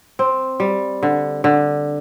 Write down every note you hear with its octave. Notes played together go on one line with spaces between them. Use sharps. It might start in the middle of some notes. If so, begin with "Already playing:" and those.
C4
G3
D3
D3